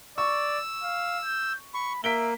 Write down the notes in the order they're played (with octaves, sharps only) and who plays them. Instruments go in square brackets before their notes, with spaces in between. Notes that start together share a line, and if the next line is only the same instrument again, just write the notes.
[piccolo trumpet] D5 [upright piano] C#6 [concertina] E6
[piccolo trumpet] F5
G6
[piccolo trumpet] B5 [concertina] C#6
[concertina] A#3 [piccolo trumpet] E5 [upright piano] B6 D7 G7